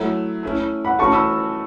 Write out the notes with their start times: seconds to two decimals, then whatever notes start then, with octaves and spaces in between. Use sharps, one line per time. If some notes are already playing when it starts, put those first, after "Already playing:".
Already playing: F#3 A3 E4
0.43 A3 C#4 E4
0.85 F#5 B5
0.99 E3 A3 C#4 F#4 A5 C#6
1.13 B5 E6